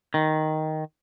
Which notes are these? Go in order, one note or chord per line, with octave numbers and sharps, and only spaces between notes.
D#3